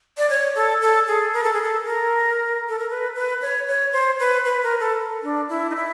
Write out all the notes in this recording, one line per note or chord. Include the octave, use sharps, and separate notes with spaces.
D5
C#5
A4
A4
G#4
A#4
A4
G#4
A4
A#4
A4
A#4
B4
B4
C#5
C#5
C5
B4
B4
A#4
A4
D4
E4
D#4
E4